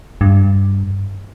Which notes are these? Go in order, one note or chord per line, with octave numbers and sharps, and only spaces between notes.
G2